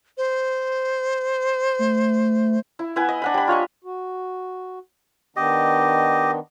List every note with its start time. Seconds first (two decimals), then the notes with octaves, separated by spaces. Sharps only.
0.17 C5
1.79 A3
2.79 E4
2.96 B3 E4 B4 G#5
3.09 D#5
3.22 D4 F#5 B5
3.34 G3 B5
3.48 F4 C#5 D#5 C#6
3.84 F#4
5.36 D#3 B3 D4 G4 D#5